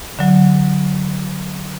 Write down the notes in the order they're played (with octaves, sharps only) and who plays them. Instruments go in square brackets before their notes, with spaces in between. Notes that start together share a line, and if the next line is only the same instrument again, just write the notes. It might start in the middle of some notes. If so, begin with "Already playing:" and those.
[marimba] D3 F#3